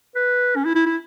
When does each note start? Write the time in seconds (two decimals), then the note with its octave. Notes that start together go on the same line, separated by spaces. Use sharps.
0.16 B4
0.56 C#4
0.65 E4
0.75 E4
0.86 E4